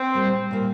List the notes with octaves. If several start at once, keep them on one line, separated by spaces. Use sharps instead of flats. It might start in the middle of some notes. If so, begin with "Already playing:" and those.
Already playing: C4
A#2 G3 A#3
A#2 G3 A#3